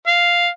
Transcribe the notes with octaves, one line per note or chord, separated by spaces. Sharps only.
F5